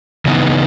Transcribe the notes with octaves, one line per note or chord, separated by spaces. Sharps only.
C#3 E3 B3 D#4